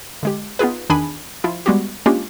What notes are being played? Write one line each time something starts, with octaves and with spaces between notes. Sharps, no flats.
D3 G#3 G4
B3 D#4 F4 G#4 B4
E2 D#3 D4 G#4 G#5 B5
F3 E4 F4
G3 G#3 B3 F#4 G4
G#3 A#3 C#4 D4 F4 G4